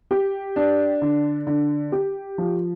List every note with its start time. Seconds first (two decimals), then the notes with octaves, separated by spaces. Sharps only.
0.11 G4
0.56 D4
1.02 D3
1.47 D3
1.92 G4
2.38 F3